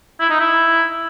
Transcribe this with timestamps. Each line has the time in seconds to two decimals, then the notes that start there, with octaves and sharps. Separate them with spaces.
0.20 E4
0.30 D#4
0.40 E4